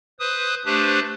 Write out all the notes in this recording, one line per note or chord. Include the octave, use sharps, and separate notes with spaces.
B4 C5 D#6
A3 D4 G4 B4 C5